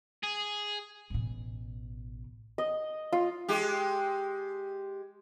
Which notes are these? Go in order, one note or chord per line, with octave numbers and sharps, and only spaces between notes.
G#4
A1 B2
D#5
F4
G#3 G4